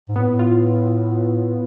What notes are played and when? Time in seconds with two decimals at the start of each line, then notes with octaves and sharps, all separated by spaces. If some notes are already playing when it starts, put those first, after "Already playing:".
0.09 G#2
0.16 A2 B3
0.39 F4